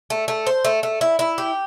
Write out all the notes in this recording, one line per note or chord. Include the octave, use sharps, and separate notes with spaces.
A3
A3
C5
A3
A3
E4
E4
G4